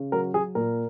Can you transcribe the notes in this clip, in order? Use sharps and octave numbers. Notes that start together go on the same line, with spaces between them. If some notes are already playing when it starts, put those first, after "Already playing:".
Already playing: C#3
F#3 A#4
F#3 G#4
A#2 A#4